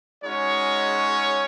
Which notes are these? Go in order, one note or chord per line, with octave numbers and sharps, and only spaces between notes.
G#3 C#4 D#4 F#4 C#5